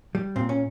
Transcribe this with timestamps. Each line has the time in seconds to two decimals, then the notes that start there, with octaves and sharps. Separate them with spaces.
0.15 G3
0.36 A#2 C4
0.49 C#4